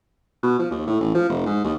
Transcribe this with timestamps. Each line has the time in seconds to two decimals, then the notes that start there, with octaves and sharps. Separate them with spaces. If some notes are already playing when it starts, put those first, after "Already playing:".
0.43 B2
0.59 F3
0.71 D#2
0.87 A2
1.01 A1
1.15 F3
1.29 F1
1.46 G#2
1.64 D#2